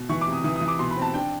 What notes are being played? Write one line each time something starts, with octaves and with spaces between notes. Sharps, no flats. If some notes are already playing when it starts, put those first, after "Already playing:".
Already playing: B2
E3 C#6
D6
C3
D#6
E3 D#6
D#6
E3
D6
B2 C6
B5
C4
A5
D4 G5